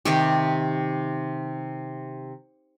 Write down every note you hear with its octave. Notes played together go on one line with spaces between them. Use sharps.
C3 D#3 G4